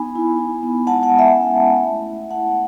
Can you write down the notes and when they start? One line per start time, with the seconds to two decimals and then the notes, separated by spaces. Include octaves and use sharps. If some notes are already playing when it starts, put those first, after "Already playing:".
Already playing: B3 D#4 G#5 B5
0.15 E4
0.39 E4
0.63 B3
0.87 G#3 F#5 A5
1.03 F#5 A5
1.11 G#3
1.19 E5 G#5
1.35 C#4
1.59 E4
1.82 A3
2.07 E4
2.31 E4 F#5 A5